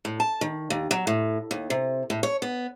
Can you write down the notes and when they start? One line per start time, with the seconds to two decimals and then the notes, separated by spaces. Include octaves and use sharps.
0.05 A2
0.20 A5
0.41 D#3
0.70 D#2
0.91 F#3
1.07 A2
1.51 D#2
1.70 C3
2.10 A2
2.23 C#5
2.42 B3